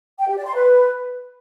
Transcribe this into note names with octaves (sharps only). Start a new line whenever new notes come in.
G5
G4
D5
C6
B4